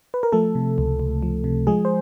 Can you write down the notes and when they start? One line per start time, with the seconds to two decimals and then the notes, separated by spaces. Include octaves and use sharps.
0.14 B4
0.23 A#4
0.32 F3 A3 A4
0.55 C3
0.78 C#2
1.00 C#2
1.22 F3
1.44 C3
1.67 F3 G#3 G#4
1.85 C5